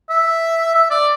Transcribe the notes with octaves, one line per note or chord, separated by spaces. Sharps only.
E5
E5
D5